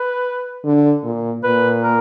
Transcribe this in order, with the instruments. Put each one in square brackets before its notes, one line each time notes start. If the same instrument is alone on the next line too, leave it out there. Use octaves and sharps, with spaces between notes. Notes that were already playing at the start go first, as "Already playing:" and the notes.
Already playing: [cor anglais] B4
[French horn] D3
A#2
[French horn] A#2 [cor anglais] B4
[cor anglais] A#4